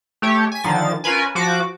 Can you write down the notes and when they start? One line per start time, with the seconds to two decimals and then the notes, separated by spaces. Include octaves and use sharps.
0.22 A3 G4 C#5
0.52 G#5 B6
0.64 D3 D#3 F3 A6
1.04 C#4 F4 A#4 B4 G#5
1.35 F3 F#4 D6